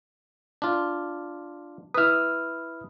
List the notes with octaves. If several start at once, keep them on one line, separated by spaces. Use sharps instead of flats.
D4 F4
E4 B4 D#6 F6